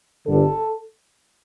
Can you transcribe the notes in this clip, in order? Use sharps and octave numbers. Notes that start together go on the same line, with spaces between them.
G1 G2 D3 A4